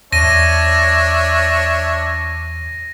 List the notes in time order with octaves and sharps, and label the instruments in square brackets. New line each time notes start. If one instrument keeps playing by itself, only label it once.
[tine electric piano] E2 [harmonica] D4 C#5 E5 [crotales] A#6 D#7